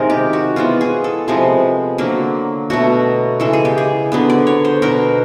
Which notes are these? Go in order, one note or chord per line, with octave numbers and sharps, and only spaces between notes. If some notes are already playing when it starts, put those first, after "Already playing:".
Already playing: C3 D#3 G#3 A#4
G4
F#4
E3 G#3 B3 F4
G#4
A4
C3 F3 G#3 B3
D3 F#3 A#3
B2 F#3 A3 F#4
C#3 E3 G#3 A4
G#4
G4
G#4
D3 F#3 B3
D5
C#5
C5
B2 F#3 B3 A#4